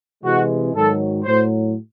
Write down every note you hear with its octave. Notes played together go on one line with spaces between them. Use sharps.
C3 E3 G#3 F#4
G#2 D#3 F#3 A4
A2 F#3 C5